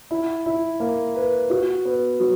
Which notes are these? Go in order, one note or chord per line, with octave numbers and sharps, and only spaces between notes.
E4
E4
A#3
B4
F#4
B3
F#3